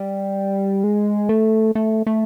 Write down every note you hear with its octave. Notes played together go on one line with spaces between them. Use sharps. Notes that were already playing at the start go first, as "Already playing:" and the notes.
Already playing: G3
G#3
A3
A3
A3